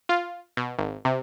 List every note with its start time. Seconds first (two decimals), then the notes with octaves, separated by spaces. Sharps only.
0.09 F4
0.57 B2
0.78 G#1
1.05 C3